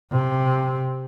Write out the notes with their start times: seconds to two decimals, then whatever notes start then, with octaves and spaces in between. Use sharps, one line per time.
0.11 C3